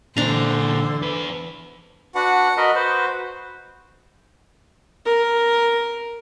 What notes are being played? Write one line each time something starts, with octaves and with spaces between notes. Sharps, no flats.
A#2 D3 E3 D4 C5 A#5
E2 B4
D4 F#4 B4 F#5
F#4 A#4 D#5 B5
B4 C5
A#4